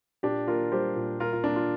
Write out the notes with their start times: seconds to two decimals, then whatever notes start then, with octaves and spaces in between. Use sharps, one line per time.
0.23 A#2 D4 G4
0.48 A#3 F4 A#4
0.71 G3 G4 C5
0.96 A#2
1.20 A#2 F4 A#4
1.33 F4
1.44 A#3 D4
1.56 F4